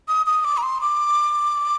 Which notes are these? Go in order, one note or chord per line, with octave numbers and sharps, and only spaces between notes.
D#6
D#6
D6
A#5
C6
D6